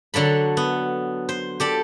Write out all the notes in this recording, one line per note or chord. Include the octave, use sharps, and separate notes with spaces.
D3 F#3 A4 B5
B3
C5
G4 A4 D5